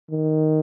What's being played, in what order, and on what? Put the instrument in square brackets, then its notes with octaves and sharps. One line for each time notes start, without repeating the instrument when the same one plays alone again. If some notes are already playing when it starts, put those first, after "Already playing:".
[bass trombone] D#3